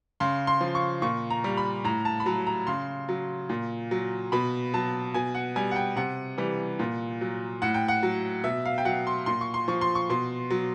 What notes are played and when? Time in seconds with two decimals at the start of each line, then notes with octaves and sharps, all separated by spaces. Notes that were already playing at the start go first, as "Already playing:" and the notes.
0.20 C#3 C6
0.47 C6
0.61 F3
0.75 C#6
1.02 A#2 C#6
1.30 A#5
1.44 G3
1.57 B5
1.84 A2 A#5
2.05 A5
2.20 B5
2.26 F#3 A#5
2.47 A#5
2.67 C#3 C6
3.09 F#3
3.49 A#2
3.91 F#3
4.32 B2 B5
4.74 F#3 A5
5.14 B2 G#5
5.35 F#5
5.56 G3 G#5
5.71 F#5
5.76 G5
5.96 C3 F#5
6.38 E3 G3
6.79 A#2
7.21 F#3
7.62 A2 F#5
7.74 G5
7.88 F#5
8.03 F#3
8.44 B2 E5
8.65 F5
8.78 G5
8.85 F#3 F#5
9.07 C6
9.26 A#2 C6
9.41 C#6
9.54 C6
9.68 F3 C#6
9.81 C6
9.95 C#6
10.10 B2 C6
10.51 F#3